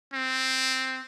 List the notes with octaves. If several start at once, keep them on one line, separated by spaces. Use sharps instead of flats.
C4